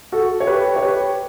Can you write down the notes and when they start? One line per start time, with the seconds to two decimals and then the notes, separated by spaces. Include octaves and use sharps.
0.12 F#4 A4
0.40 C#5
0.47 G4 B4
0.76 C#5
0.82 G4 B4